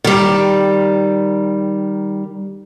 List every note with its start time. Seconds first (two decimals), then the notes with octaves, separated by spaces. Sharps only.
0.04 D#3 G3